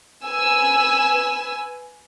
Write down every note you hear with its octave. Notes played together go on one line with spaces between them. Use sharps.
B4 G#5 E6